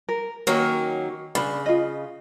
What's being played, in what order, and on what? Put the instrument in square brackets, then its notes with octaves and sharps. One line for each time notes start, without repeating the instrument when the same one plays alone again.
[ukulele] A#4
[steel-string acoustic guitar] D#3 F#3 A#3 [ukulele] C#4 A#4
[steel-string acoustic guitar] C#3 [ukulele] D4 B5
[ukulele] F4 D#5